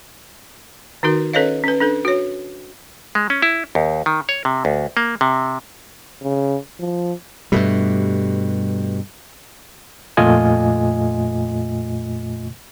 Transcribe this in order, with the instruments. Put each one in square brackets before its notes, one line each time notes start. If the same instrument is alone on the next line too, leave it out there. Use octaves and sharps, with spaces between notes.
[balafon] D#3 D#4 F#4 A#4
C#4 A4 B4 C#5 D#5 F5
C#4 B4
D4 A4 B4
F#4 C#5
[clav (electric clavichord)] G#3
C#4
E4
D#2
D#3
C#5
C3
D2
A#3
C3
[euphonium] C#3
F3
[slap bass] G2 B2 [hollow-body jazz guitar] G3 A3
[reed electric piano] F2 A#2 A3 F4 D#5 G#5